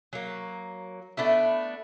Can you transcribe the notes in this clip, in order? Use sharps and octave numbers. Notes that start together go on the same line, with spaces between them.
F#3 A#3
A3 B3 D4 E4